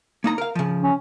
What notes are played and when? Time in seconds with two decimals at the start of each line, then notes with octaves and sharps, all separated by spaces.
0.24 A#3 D#4 A#5
0.38 A#4 F5
0.55 C#3 F3
0.83 C#4